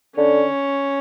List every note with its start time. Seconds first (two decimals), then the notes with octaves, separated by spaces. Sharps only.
0.16 D3 C#4